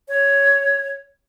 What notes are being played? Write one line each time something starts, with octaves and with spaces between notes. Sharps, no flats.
C#5